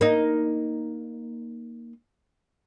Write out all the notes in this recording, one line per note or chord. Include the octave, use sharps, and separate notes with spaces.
A#3 D#4